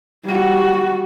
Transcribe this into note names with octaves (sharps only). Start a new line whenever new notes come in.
G3 F#4